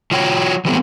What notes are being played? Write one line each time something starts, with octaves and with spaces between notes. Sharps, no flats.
F#3 F4 F#4 C#5 G5
E3 F#3 G3 A3 B3 C4